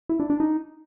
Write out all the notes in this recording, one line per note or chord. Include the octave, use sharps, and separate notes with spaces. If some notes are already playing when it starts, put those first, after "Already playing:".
E4
D4
D4
D#4